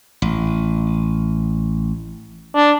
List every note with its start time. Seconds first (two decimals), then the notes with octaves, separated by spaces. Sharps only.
0.22 A1
2.56 D4